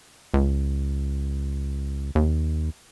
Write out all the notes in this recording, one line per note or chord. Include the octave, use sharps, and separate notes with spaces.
C#2
D#2